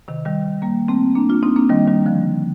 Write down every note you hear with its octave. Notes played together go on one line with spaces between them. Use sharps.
C3 D#3
D#3 G3
G3 A#3
A3 C4
A#3 D4
D4 F4
C4 D#4
A#3 D4
D#3 G3
D#3 G3
D3 F3